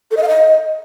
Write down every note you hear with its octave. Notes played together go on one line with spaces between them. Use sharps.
A4
D#5
F5
D#5